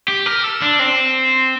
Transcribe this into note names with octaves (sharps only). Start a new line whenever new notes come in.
G4
A#4
A4
D4
C4